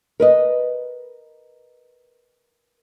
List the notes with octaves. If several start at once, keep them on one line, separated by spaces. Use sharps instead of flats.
A#4 B4 D#5